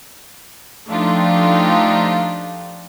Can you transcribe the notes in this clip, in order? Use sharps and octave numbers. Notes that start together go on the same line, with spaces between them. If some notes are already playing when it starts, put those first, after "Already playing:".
F3 A3 D4 D#4 F4 G4